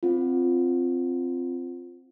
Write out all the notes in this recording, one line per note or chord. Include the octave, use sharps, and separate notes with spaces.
C4 F4